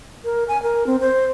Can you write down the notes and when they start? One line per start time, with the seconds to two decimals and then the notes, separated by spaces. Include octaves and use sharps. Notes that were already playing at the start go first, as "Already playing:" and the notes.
0.24 A#4
0.48 G#5
0.63 A#4
0.87 C4
1.01 C5